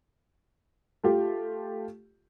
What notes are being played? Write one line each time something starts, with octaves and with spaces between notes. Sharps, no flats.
A3 F4 G4